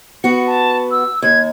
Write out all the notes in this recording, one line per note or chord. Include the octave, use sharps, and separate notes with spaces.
B3 F#4 C#7
A5
E6
D#2 G#6